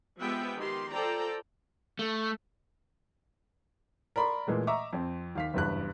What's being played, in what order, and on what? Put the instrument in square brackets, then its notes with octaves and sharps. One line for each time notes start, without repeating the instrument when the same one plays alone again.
[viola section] F3 G#3 B3 G4 E5 G5
D#3 G4 C6
F4 A4 C5 D5 G5 A#5
[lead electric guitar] A3
[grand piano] A#4 D5 B5 C6
A#2 E3 G#3 A3
D#5 E5 A#5 C#6 D6
F2 C4
D#2 F5 B6
F#1 E2 G2 F#6